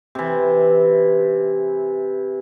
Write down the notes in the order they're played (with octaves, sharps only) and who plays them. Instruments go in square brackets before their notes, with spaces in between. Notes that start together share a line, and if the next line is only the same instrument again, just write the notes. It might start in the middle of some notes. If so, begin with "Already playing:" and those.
[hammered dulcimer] C3 E3